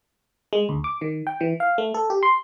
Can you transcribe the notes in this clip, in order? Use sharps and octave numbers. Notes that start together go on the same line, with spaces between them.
G#3
D2
D6
D#3
G5
E3
F5
A3
A4
G4
C6